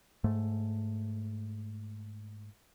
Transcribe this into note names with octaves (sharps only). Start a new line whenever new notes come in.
G#2 A3